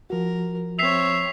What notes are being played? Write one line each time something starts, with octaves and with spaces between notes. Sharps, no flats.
F3 F#4 A#4
C4 C#5 E5 B6 C7 F7